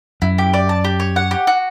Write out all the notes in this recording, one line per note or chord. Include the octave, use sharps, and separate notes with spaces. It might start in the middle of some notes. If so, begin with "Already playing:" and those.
F#2 E4
G4
D5
A5
G4
C#5
F#5
G4
F#4